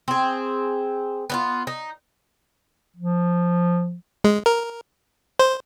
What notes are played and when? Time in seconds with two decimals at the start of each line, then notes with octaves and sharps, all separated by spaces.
0.08 C4 G#4
1.30 B3 D#4 F4
1.67 D#4
2.96 F3
4.24 G#3
4.46 A#4
5.39 C5